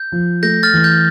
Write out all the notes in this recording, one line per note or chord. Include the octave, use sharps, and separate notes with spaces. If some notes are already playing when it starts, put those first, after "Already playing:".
Already playing: G6
F3
A3 G6 A#6
F6 A6
E3
G6